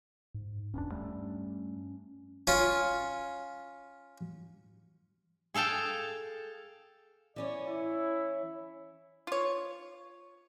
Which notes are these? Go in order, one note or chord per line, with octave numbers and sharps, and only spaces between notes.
G#2
D1 E2 C#4 D4
G2 G3 A3
C#4 F4
G#4 A4 F5 G5 A5
E3 C#4 C#5 D5
E4
F4 C#5